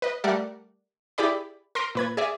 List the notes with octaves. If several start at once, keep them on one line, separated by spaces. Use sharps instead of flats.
B4 D#5
G3 A3 G4 A#4 D5 F#5
E4 G4 G#4 D5 B5
A#4 C6 A#6 D7
A#2 B4 G#6
G#4 D5 E5